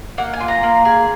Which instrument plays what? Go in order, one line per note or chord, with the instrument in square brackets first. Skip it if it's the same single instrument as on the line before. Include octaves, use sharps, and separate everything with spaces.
[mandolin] A#3 F#5
G#5
F4
A#5
A#3
G#4